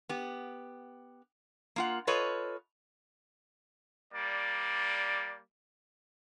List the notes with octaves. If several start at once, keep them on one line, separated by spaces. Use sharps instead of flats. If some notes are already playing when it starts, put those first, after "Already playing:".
B3 G4
A#3 F4 F#5
F4 A4 B4 C#5 D#5
G3 A#3 D5